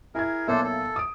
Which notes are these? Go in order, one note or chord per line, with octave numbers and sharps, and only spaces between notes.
E4 G#4 A#4 G#6
B1 A#3 D4 A4 C5 E5
A4
D#6 D7